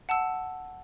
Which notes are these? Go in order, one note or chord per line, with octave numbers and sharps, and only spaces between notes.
F#5 A5 E6